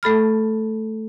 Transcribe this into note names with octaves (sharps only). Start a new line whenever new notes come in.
A3 A4 B5 F6